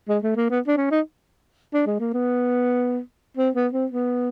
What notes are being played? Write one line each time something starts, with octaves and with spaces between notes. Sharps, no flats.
G#3
A3
A#3
B3
D4
C#4
D#4
D4
G#3
A#3
B3
C4
B3
C4
B3